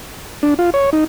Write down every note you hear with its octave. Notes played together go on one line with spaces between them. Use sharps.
D4
F4
C#5
D#4